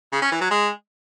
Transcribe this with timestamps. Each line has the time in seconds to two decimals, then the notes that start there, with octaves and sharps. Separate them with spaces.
0.12 C#3
0.22 C#4
0.32 E3
0.41 F#3
0.51 G#3